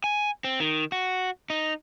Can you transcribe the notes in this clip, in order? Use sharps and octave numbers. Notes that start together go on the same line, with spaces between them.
G#5
C4
D#3
F#4
D#4